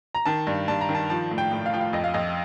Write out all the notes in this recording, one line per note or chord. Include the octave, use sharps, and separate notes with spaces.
A#5
D#3 A5
G2
G2 A5
A#5
D#3
A5
F3 A5
A2
G5
A2
F5
F3 G5
F5
F2 D#5
F5
F2 D#5